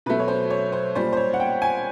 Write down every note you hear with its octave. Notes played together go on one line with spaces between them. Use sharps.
B2 F#3 A3 B4
C#5
C5
C#5
C5
A#2 G3 C5
C5
C#5
F#5
G5
G#5